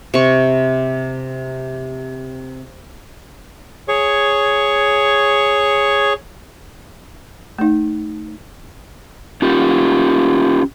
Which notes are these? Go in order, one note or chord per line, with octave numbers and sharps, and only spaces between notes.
C3 C#6
G#4 C#5 C#6
A3 D#4
C#4 F4 G4